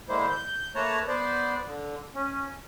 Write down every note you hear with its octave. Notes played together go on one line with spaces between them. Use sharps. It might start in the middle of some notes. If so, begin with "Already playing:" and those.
D3 G#3 A#3 E4 C5
G6
A3 A#3 B4 C#5 A5 A#5
B3 B4 C5 D5
D3
C#4